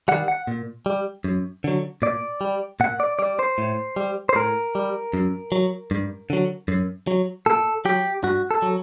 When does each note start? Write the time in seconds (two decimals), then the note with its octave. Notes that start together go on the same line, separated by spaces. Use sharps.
0.08 D#3 G3 F#5
0.28 F#5
0.47 A#2
0.86 G3
1.24 F#2
1.64 D3 F#3
2.02 A#2 D5
2.41 G3
2.80 A#2 F#5
3.00 D5
3.19 G3 D5
3.39 C5
3.58 A2
3.96 G3
4.29 C5
4.35 A2 A#4
4.75 G3
5.14 F#2
5.52 F#3
5.91 G2
6.30 D3 F#3
6.68 F#2
7.07 F#3
7.46 A#2 A4
7.85 F#3 G4
8.24 G2 F#4
8.51 A4
8.62 F#3